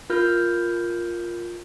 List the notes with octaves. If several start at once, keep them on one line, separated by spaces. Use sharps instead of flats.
F4 A#4 F6 G6